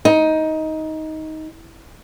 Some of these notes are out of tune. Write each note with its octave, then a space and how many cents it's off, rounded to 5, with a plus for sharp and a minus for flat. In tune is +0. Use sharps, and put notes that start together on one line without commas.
D#4 +15